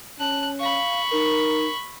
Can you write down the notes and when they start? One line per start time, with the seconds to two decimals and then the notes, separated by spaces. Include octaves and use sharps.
0.19 C#4 A5 F#6
0.59 F5 B5 C#6
1.12 D#4 A#4